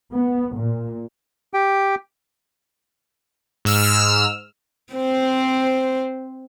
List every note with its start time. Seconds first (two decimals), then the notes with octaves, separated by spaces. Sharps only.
0.11 B3
0.55 A#2
1.54 G4 G5
3.65 G#2 E6 F6
4.94 C4 C5